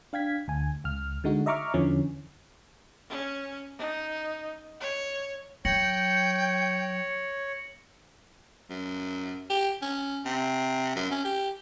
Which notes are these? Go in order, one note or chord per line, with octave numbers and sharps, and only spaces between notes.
D4 F5 G5 G#6 B6
D2 G#5
C#2 F6
D3 G#3 D#4 F#4
D#5 E5 A#5 C#6 D6 F6
E2 D3 E3 F3 C#4
C#4
D#4
C#5
F#3 C#5 G5 A#6 C#7 F#7
F#2
G4
C#4
C3
F#2
C#4
G4